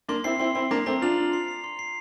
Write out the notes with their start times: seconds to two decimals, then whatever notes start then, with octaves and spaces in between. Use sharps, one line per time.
0.08 A#3 D4 C6
0.24 C4 E4 C7
0.40 C4 E4 C6
0.55 C4 E4 C6
0.71 A#3 D4 A#5
0.86 A3 C4 A#5
1.02 D4 F4 F7
1.17 F7
1.33 C7
1.48 C7
1.64 C6
1.79 C7